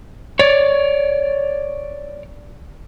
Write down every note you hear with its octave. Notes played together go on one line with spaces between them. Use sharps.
C#5 D5